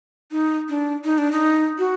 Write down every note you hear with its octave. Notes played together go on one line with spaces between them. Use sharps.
D#4
D4
D#4
D4
D#4
F#4